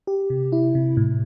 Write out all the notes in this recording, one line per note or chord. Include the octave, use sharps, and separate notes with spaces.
G4
C3
E4
C3
A2